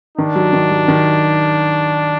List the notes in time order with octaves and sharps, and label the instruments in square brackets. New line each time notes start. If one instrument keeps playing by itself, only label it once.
[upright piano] D#3 [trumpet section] D4
[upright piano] F#3
D#3
F#3
D#3